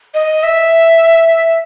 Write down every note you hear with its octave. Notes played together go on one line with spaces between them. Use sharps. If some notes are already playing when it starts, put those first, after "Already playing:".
D#5
E5